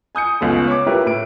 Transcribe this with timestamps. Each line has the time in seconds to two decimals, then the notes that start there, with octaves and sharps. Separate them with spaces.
0.15 G#5 D#6 G6 C#7
0.41 C#2 A3 B3
0.68 C#5 D6
0.87 E4 F4 G4 A#4 B4
1.06 A2 D7